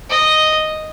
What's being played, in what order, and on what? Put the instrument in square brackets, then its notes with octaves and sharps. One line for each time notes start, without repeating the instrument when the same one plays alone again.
[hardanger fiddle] D#5